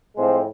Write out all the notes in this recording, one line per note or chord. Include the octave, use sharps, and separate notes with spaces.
A2 F3 G#3 C4